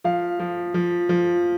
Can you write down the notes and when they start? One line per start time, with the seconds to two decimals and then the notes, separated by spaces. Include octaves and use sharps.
0.04 F3 F5
0.40 F3
0.74 F3
1.09 F3